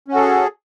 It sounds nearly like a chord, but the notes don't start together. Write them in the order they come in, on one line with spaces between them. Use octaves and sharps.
C#4 F#4 A4 G#4